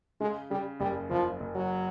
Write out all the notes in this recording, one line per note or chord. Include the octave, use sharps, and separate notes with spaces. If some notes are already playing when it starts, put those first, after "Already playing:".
C#3 G#3
C#3 G3
F#1 G3
F#1 F3
F#1
F#3